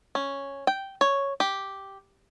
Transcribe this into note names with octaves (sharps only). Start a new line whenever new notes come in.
C#4
G5
C#5
G4